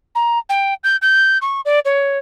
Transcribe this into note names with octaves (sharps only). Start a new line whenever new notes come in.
A#5
G5
G6
G6
C#6
D5
C#5